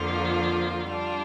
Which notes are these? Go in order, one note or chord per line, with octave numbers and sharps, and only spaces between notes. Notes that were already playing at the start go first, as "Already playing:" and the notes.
Already playing: F2 D3 F3 A#3 F4
G3 D4 F4